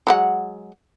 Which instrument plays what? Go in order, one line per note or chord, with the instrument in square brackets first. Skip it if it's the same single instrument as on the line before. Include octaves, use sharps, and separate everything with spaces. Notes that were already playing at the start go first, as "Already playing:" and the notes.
[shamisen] F#3 G#3 F#5